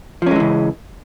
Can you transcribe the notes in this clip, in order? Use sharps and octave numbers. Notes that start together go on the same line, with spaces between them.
C#3 E3 F3 G#3 C#4